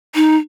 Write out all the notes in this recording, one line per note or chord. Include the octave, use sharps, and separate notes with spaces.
D#4